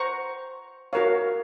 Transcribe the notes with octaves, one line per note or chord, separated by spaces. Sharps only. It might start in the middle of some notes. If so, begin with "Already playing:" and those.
Already playing: C5 F#5 A#5 C#6
F#4 A#4 C#5 F5